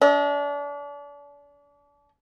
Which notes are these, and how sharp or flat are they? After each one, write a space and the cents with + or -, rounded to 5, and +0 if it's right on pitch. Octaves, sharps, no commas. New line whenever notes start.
D4 -35 D#5 +45